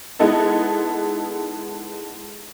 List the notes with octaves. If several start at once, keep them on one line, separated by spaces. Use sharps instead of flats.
G#3 B3 D#4 E4 A4 D#5